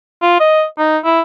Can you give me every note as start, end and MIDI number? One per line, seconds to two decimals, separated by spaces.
0.22 0.40 65
0.40 0.64 75
0.78 0.98 63
1.04 1.21 64